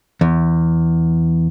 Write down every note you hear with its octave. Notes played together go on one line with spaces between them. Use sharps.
E2